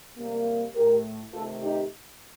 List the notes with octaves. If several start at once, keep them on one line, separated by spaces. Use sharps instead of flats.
C3 G3 A#3
A2 A3 G4 A#4
C3 D#3 A3 F4 A4
D#4 G4